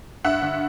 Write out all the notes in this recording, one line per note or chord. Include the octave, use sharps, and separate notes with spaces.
G2 E5 F#5
D3